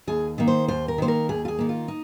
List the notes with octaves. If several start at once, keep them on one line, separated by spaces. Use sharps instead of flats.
D#2 G#4
D#3 A#3
C5
D#2 C5
A#4
D#3 A#3 C5
A#4
D#2 G#4
F4
G#4
D#3 A#3
F4
D#4